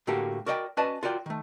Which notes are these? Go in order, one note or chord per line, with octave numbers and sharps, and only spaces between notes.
A2 D3 A3 A#3 F#4 G4
F#4 A#4 D5 D#5 F5 G5
C#4 F#4 B4 D5 D#5 A5
F4 F#4 A#4 D5 G5
D#3 A3